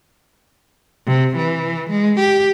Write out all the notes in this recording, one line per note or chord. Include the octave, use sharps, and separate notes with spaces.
C3
E3
G#3
G4